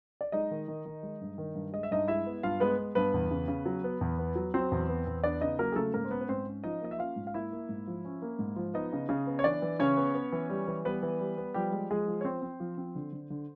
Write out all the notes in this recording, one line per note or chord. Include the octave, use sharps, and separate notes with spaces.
D5
G#3 D#4 D#5
D#3
D#3
D#3
G#3
G2
D#3
G2
G#3 D#5
E5
G2 D#4 D#5
G#3 E4 E5
B3
G2 F4 F5
G#3 B3 B4
B3
G2 B3 B4
E2
C#3
C#3
F#3
B3
E2
B3
F#3
F#3 C4 C5
E2
B3
E2
B3 D4 D5
C#3 D#4 D#5
F#3 A#3 A#4
G#4
C#3 A3 A4
G#2 A#3 A#4
C5
B3 C#4 B4
B4
G#2 C4 C5
C#4
F3 D#4 D#5
A#3 D#5
E5
C#4 F4 F5
G#2
F5
A#3 E4 E5
A#3
G#2
F3
C#4
A#3
G#2
F3
B3 D#4 D#5
C#3
C#3
B3
C#5
E3 D4 D5
E3
C#3 C#4 C#5
B3
B3
E3
G3
E3
G3 B3 B4
E3
G3
B3
F3 G3 G4
G#3
F3 G#3 G#4
F3
C#5
C4 C5
C4
F3
C4
D3
D3
D3